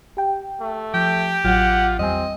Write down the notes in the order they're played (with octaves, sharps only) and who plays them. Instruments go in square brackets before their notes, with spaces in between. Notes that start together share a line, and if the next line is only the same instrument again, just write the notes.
[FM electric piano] G4 G5
[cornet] A3
[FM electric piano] F3 [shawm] G4 [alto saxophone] G5
[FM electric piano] A1 F#3 [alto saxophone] F4 [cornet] F#5
[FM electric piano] E2 G3 G#5 [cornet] C4 [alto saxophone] D#5